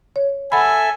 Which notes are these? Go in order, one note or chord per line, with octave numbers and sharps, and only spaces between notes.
C#5
A4 E5 F#5 G#5 B5